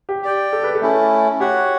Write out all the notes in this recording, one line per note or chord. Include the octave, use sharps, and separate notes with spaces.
G4
G4 D5 G5
A4
B4
A4
A3 C#4 E4
F#4 G4 C#5 F#5